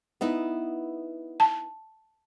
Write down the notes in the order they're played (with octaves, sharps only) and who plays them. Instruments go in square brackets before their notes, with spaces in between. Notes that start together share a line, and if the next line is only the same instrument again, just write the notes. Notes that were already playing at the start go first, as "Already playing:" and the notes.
[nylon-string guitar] B3 D#4 E4
[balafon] A5